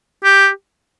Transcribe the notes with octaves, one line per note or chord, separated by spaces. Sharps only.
G4